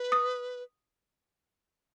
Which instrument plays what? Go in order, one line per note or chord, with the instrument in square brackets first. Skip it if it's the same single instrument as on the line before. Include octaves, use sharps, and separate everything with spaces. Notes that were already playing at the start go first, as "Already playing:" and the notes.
Already playing: [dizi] B4
[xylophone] D#6